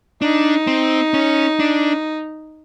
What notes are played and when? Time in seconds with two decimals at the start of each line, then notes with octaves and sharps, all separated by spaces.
0.22 D4 D#4
0.67 C4
1.14 C#4
1.60 D4